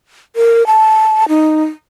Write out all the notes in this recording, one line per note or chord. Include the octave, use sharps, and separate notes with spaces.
A#4
A5
D#4